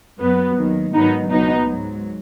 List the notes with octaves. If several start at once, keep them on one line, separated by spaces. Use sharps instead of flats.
F#2 F#3 B3
D#2 D#3 F#3
G#2 D#3 F#3 B3 D#4
C#2 B2 F#3 B3 D#4
G#2 F#3